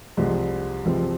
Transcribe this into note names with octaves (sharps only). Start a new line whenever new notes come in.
C2 C3 F3 G#3 C4
C2 C3 F3 G#3 C4